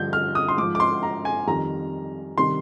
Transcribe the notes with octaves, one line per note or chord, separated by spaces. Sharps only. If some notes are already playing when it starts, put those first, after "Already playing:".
Already playing: G2 D3 F3 G6
F6
D#6
C6
G#2 F3 D6
D6
C6
A#5
G#5
F2 D#3 G3 A#5
C3 D#3 G3 C6